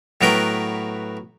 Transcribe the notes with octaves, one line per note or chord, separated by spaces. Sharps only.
A2 F#3 B3 A#4 B4 G5